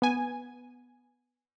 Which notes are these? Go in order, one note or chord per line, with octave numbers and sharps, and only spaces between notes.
B3 G#5